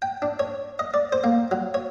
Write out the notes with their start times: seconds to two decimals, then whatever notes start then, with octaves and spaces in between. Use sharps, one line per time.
0.02 G5
0.22 D4
0.39 C#5
0.79 D#5
0.94 D5
1.12 C5
1.24 A#3
1.51 F#3
1.74 C#5